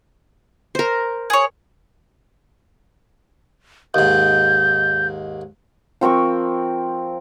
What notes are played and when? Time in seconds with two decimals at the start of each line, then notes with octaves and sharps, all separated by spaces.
0.75 A#4 C5
1.30 G#4 C#5
3.94 D#2 G#2 G6
6.01 F3 C4 A#4 C#6